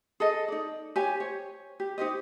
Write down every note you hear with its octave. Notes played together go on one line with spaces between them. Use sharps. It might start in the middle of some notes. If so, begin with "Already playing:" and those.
G#4 A4 D#5
D#4 D5
G4 C#5 G#5
C5 C#5
G4
D#4 G4 C5 D#5